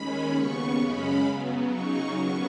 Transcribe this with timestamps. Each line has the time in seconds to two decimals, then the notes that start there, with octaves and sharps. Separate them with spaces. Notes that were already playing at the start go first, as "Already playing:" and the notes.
Already playing: D#2 D#3 G#3 C#4 B5
0.33 D#2 C#3 B3 C#6
0.79 F#2 C#3 G#3 C#4 B5
1.24 C#3 F#3 B3
1.69 C#3 F#3 D#4 C#6
2.13 D#2 C#3 F#3 B3 C#6